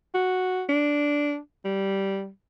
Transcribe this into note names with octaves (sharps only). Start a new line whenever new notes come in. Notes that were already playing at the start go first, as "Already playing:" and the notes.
F#4
D4
G3